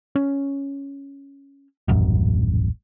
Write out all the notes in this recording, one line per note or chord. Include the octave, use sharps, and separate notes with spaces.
C#4
D#1 A1 F#2